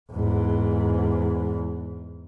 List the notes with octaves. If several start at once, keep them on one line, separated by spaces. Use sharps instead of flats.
E2 G#2